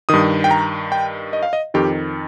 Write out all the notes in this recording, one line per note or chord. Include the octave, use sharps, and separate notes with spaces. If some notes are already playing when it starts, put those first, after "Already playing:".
G2 D#3 D#6
G5
A#5
G5
D#5
F5
D#5
F2 D#3 G4